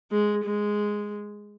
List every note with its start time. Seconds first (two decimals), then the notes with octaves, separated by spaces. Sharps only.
0.11 G#3
0.44 G#3